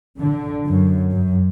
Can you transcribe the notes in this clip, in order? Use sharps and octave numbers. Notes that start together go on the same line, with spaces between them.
D3
F#2
F#2